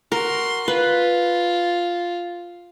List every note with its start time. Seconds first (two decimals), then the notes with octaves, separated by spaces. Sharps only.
0.12 F#4 A#4 C6
0.68 F4 B4